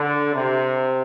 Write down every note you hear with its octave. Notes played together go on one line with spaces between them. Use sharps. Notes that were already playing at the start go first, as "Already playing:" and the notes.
Already playing: D3
C3